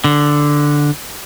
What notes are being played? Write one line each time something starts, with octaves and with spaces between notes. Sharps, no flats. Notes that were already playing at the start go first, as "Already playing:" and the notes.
D3